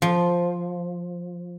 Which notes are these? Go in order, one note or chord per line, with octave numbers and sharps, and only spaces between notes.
F3